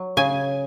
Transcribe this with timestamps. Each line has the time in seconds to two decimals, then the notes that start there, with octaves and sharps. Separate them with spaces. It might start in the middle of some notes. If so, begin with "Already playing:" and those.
Already playing: F#3
0.17 C#3 G#5